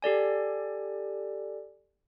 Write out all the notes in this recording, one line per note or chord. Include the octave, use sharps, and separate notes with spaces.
G4 A4 D5 G#5